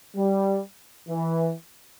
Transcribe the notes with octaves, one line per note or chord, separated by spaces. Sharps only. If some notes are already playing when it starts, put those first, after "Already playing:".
G3
E3